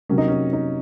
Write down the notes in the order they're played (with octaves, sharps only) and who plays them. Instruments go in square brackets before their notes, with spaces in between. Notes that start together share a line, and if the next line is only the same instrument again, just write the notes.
[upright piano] C3 F#3 A#3 C#4
D#4
C#4
D#4